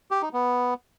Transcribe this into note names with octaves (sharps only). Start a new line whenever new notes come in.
G4
D#4
B3